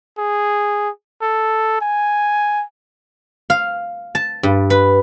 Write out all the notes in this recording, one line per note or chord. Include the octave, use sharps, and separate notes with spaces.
G#4
A4
G#5
F5
A5
G2
B4